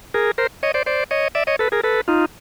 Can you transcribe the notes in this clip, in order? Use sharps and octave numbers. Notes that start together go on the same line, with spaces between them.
G#4 A#4
A#4 C5
C#5 D#5
C5 D5
C5 D5
C#5 D#5
D5 E5
C#5 D#5
A4 B4
G#4 A#4
A4 B4
D#4 F4